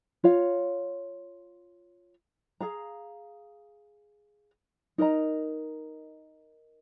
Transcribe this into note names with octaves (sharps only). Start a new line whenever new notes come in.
F4 C#5 F5
G#4 F5 A#5
D#4 A#4 D#5 A#5